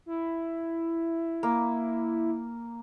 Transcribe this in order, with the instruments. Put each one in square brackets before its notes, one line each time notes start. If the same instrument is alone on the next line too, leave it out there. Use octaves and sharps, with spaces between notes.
[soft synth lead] E4
[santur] A#3